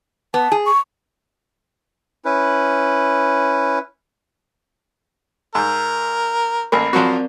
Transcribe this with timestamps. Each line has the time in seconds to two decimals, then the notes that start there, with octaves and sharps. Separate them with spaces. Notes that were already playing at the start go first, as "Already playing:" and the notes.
0.34 B3 A5
0.52 G#4
0.66 C#6
2.25 C#4 E4 B4
5.55 G#2 A#4 E6 G6
6.72 A1 A#3 B5 C7
6.93 F3 F#3 C4 F#4 A#4 D5